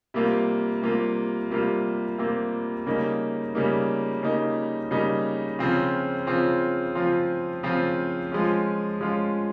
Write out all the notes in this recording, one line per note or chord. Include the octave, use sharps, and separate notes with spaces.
C3 G3 A#3 F4
C3 G3 A#3 F4
C3 G3 A#3 F4
C3 G3 A#3 F4
C#3 G3 A#3 D#4
C#3 G3 A#3 D#4
C#3 G3 A#3 D#4
C#3 G3 A#3 D#4
C#3 F3 C4 F4
C#3 F3 C4 F4
C#3 F3 C4 F4
C#3 F3 C4 F4
F3 G#3 C#4 F4
F3 G#3 C#4 F4